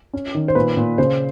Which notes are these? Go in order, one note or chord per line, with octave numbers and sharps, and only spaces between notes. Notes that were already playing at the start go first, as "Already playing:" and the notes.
C#4
D#3
C5
A#2 B4
A#2
C#3 C5